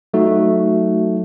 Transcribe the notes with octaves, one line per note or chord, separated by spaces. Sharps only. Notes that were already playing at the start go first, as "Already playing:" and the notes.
F#3 A3 D#4 F#4